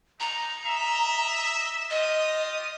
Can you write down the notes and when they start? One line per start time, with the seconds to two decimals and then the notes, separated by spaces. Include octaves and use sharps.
0.20 G#3 D#4 A#5
0.64 D#5 E5
1.90 F4 G4 D#5 D#6